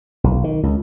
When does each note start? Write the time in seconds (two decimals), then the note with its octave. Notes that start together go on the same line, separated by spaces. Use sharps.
0.24 B1
0.44 D#3
0.63 C#2